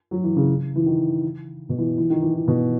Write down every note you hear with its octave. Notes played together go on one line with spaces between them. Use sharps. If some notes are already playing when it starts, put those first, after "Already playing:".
F#3
E3
C#3
E3
D#3
B2
E3
E3
D#3
E3
D#3
B2